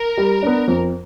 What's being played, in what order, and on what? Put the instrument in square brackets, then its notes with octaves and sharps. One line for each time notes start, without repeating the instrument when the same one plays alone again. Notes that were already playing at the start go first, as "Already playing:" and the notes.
Already playing: [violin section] A#4
[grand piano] G3
B3 D4
F2